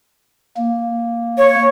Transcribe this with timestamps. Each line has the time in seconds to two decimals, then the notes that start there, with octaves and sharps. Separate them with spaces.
0.57 A#3
1.38 C#5